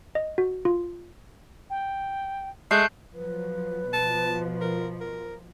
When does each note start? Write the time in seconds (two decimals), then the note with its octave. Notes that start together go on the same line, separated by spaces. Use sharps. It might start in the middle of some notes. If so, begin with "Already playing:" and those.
0.15 D#5
0.38 F#4
0.65 F4
1.70 G5
2.71 G#3 A3 F#6 G6 C7
3.14 F3 F#3 B4
3.93 B2 F3 A5
4.61 A#4
5.00 A#4